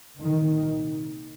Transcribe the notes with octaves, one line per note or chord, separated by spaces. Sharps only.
C2 A#2 D#3